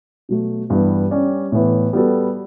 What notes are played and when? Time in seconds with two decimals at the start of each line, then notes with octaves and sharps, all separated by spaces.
0.29 B2 F#3 A3
0.70 G2 E3 G3 B3
1.11 G3 C#4 G4 D5
1.52 A2 E3 B3
1.93 G3 B3 F#4 A4